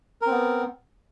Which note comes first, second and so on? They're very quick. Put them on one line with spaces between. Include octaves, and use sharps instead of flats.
A#4 C4 B3